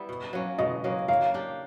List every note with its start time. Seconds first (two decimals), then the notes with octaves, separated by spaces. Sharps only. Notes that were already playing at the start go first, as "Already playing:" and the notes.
Already playing: G3 B3 E4
0.09 B2
0.33 F#3 A#3 C#4
0.58 B2 D#5
0.84 F#3 A#3 C#4
1.08 A#3 F5
1.34 D4 G4